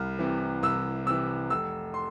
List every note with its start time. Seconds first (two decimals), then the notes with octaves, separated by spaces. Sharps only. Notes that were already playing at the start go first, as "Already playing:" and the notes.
Already playing: C2 F6
0.19 C3 E3
0.63 C2 E6
1.06 C3 E3 E6
1.50 F1 E6
1.94 C6